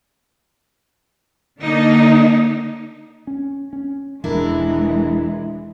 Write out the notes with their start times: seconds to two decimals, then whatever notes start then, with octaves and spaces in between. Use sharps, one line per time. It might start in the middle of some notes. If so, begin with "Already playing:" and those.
1.60 D3 A#3 D#4
3.27 C#4
3.73 C#4
4.24 E1 E3 G#3 D4 E4 A#4